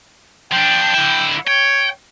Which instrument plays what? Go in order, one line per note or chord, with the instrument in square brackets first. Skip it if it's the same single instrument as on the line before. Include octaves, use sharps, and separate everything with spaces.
[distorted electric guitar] F3 D4 [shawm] G5
[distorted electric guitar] D3 E4
[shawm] C#5 [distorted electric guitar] G5